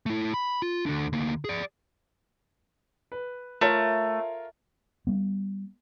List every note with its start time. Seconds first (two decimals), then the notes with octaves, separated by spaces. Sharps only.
0.06 A3 E4
0.34 B5
0.62 F4
0.86 D2 D3
1.13 D2 A#3
1.45 G#4 D5
3.12 B4
3.61 A3 F4 A#4 C#5
5.07 G3 B3